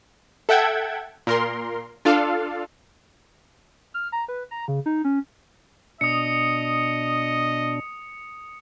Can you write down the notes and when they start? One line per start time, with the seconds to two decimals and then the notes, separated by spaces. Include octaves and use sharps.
0.49 A4 E5 F#5 G5 G#6
1.27 A#2 A#4 C6
2.05 D4 F4 A4 F5
3.94 F6
4.12 A#5
4.28 B4
4.51 A#5
4.68 C#3
4.86 D#4
5.04 C#4
6.01 B2 D4 D#5 D#6 C#7